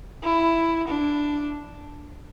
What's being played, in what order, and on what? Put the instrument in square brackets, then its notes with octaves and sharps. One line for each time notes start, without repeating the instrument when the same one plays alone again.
[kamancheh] E4
D4